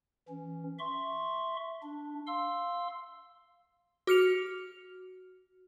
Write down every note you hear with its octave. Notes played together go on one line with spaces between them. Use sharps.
E3 C#4
E5 C6 C#6
D4
F5 C6 E6
F#4 F6 C#7 F7